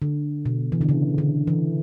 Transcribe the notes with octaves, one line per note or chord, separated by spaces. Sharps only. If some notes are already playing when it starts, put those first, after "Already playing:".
D3
B2
E3
D3
C#3
D3
E3